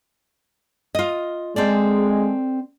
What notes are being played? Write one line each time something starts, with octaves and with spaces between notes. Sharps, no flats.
F4 D#5
G#3 C4 A4 D5